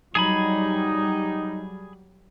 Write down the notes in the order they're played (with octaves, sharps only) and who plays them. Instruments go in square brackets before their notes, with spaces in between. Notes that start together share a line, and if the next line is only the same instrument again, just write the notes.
[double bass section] F#3 G3 [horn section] D#4 [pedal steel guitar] G#4 G#5 B5